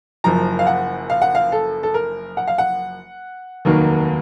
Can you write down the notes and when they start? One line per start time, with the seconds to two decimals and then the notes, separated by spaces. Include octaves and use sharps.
0.24 F#1 F#2 F3 A#5
0.59 F5
0.67 F#5
1.10 F5
1.22 F#5
1.35 F5
1.52 A4
1.83 A4
1.94 A#4
2.37 F#5
2.48 F5
2.58 F#5
3.65 F1 D#2 D#3 F#3 A#3